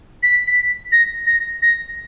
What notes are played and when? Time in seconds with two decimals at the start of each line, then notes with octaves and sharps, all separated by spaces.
0.23 B6
0.47 B6
0.92 A#6
1.26 A#6
1.62 A#6